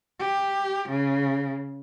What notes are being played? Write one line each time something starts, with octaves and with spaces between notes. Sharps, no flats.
G4
C#3